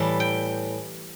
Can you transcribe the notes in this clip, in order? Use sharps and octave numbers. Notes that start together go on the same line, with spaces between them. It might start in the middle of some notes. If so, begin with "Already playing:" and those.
Already playing: A2 E3 G3 A5
G5